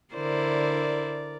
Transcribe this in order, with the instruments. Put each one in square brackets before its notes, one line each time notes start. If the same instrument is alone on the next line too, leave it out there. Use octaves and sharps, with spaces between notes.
[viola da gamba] D3 E4 C5 [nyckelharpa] A#4 D5